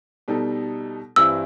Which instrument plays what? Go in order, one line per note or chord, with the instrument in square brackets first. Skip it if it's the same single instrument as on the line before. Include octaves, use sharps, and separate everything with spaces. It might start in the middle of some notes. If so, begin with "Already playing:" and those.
[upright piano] B2 G3 D#4 A4
[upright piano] G2 E3 G3 C4 E4 [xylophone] E6